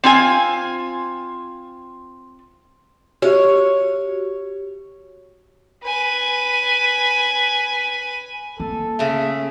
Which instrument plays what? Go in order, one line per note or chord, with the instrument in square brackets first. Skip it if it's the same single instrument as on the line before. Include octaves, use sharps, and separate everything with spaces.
[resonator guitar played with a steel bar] C4 F4 G#5
[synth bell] F#4 G4 [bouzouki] C#5
[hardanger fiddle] B4 G#5
[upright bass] A#3 [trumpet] A4
[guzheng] C#3 A3 [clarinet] E5